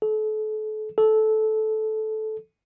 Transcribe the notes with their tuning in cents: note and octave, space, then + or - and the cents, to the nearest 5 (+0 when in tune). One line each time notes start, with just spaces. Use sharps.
A4 -35
A4 -15